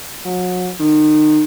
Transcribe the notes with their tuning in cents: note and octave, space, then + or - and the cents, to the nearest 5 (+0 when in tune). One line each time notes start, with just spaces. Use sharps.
F#3 -35
D#3 -30